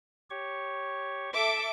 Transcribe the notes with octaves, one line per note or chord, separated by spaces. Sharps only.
G4 C#5 C#6
A4 E5 D6